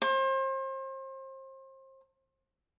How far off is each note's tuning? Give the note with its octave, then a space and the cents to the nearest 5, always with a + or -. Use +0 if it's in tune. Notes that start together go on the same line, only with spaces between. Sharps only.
C5 +35